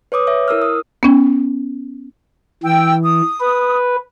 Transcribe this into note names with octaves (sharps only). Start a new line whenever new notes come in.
B4 C#5 D6 D#6
C#5 E5
E4 A#4 E6 F6
D#6
B3 C#4
E3 G5 E6
D#6
B4